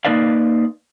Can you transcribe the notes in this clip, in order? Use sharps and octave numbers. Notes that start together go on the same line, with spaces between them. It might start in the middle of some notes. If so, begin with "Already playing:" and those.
A#3 B3 D#4 B4 D5 F5